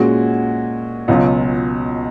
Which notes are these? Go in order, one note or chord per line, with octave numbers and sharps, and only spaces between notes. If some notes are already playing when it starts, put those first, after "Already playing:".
Already playing: A#2 G#3 C#4 F#4
C#2 B2 F#3 C#4 F4